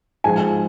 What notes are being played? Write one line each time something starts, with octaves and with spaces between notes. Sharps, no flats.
G#2 F3 G#3 G#5